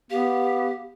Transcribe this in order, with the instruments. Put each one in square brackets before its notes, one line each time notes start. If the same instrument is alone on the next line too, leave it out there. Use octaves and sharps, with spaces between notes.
[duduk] B3 [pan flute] G4 [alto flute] F5